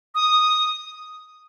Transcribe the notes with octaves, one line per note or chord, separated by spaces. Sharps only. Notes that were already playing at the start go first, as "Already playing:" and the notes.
D#6